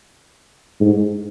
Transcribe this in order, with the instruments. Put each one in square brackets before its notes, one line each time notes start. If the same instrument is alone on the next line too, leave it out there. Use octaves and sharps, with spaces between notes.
[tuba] G#2